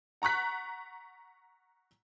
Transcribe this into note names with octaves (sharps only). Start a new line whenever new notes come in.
F#5 A#5 C#6 F#6 B6